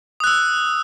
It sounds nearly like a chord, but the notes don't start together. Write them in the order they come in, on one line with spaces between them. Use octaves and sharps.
D#6 F#6 E6